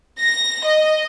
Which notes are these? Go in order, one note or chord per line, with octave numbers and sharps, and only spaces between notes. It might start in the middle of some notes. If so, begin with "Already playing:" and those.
A#6
D#5